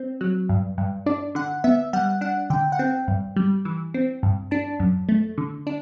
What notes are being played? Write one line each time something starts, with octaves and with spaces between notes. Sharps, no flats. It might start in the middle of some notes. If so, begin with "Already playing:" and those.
Already playing: C4
F#3
G2
G2
D4 D5
D3 F#5
B3 E5
G3 F#5
D4 F#5
D3 G5
F#5
C4 G5
G2
G3
E3
C4
G2
D4 A5
F#2
A3
D3
D4